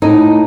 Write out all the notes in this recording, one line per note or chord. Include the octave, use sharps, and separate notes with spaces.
A2 D#4